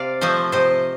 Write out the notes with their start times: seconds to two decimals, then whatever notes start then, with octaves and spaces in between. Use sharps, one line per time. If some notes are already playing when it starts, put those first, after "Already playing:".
Already playing: C3 D5 F5
0.21 F3 A3 C5 D#5
0.52 C3 C5 D#5